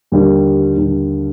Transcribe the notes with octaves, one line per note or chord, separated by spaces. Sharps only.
D#2 D3 G3
D#2 D3 G3